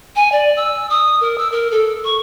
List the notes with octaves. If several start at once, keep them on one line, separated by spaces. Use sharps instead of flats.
G#5
D5
E6
D#6
A#4
E6
A#4
A4
C#6